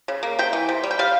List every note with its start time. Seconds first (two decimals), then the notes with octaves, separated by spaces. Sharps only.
0.08 C#3
0.23 A#3
0.39 C3 G5
0.53 E3
0.69 C3
0.83 G3
0.91 G5
0.99 G3 F5